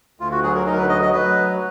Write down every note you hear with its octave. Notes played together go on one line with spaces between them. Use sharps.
D2 F4
F#4
F#3 G#4
A#4
D2 D#4
A#4
B4
F#3 D#5
D#5
F#3 B4